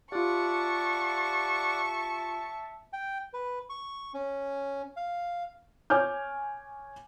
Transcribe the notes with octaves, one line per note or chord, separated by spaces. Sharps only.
F4 G4 D5 E5 F#5 A5 C#6
G5
B4
C#6
C#4
F5
C#5 G#5 D6 F6 G6